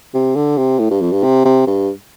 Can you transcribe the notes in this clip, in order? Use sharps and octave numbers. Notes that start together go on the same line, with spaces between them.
C3
D3
C3
A2
G2
F2
G2
C3
C3
G2